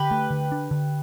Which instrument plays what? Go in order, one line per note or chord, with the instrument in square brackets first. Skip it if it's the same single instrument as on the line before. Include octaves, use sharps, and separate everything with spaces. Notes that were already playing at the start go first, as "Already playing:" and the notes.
Already playing: [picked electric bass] D3 [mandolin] G4 B4
[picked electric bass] A3
D3
D4
D3